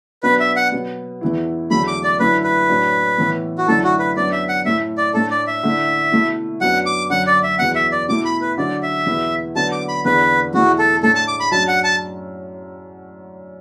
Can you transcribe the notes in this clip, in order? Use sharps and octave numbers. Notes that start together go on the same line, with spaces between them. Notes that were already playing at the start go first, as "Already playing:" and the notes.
B2 F#3 B3 D4 B4
E5
F#5
B2 F#3 B3
E2 E3 B3 E4
E2 D3 F#3 A3 B5
D6
D5
F#2 D3 A3 E4 B4
B4
A2 F#3 D4
A2 E3 B3 E4
F#4
F#2 D3 A3 E4 A4
F#4
B4
F#2 F#3 B3 D4 D5
E5
F#5
A2 A3 E4 E5
D5
A2 A3 D4 A4
D5
E5
D3 A3 E4
B2 A3 E4
F#2 F#3 B3 D4 F#5
D6
F#2 D3 F#3 F#5
D5
E5
E2 B2 F#3 B3 F#5
E5
D5
B2 A3 E4 D6
B5
B4
D3 F#3 D4 D5
E5
E2 B2 B3 E4
D3 F#3 B3 A5
D6
B5
E2 D3 B3 B4
E2 B2 A3 E4 F#4
A4
A2 A3 D4 A4
A5
D6
B5
F#2 F#3 D4 A5
F#5
A5